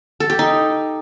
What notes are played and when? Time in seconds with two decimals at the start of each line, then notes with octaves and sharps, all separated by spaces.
0.20 A4
0.30 G4
0.39 D#4